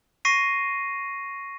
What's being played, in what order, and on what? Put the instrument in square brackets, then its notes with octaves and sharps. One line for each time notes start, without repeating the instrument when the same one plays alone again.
[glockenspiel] C#6 A#6 C7 D#7